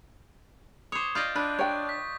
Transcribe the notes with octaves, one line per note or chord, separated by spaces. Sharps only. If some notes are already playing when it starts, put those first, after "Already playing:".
C5 C#5 D6 D#6
F4 D5 D#5 G6 A6
D4 B4
C#5 G5 C#6
B6